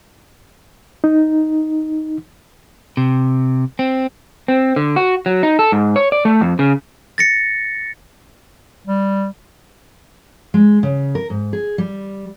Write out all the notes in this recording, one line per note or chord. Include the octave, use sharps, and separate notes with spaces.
D#4
C3
C4
C4
D3
F#4
F#3
D#4
A4
G#2
C#5
D5
A3
F2
C#3
A6 A#6 C#7
G3
G#3
C#3
A#4
G#2
G#4
G3